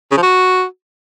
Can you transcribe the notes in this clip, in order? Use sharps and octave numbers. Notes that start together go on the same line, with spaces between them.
C#3
F3
F#4